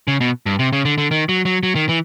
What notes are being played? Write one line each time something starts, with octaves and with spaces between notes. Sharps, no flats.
C#3
B2
G2
C3
C#3
D3
D3
D#3
F#3
F#3
F#3
D#3
E3